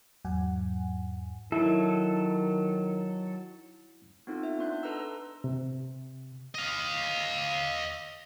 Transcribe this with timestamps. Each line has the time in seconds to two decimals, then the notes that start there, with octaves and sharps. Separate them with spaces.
0.25 E2 G#2 F#3 F#5 G#5
1.52 D#3 F#3 E4 A4
4.27 B3 C4 D#4 F4 A4
4.43 E5
4.59 B3 D4 C6 F#6 G6
4.83 A4 B4 D#5 A#5 C6 E6
5.44 C3
6.55 D#5 F5